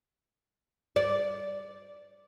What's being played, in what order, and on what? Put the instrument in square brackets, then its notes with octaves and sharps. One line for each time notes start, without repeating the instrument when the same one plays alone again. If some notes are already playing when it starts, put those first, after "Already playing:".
[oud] D5